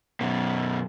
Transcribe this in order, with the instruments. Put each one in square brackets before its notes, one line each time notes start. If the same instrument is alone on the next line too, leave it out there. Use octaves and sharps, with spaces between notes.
[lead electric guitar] F#2 B2